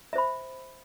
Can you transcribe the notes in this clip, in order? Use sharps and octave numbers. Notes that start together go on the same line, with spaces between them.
C5 E5 B5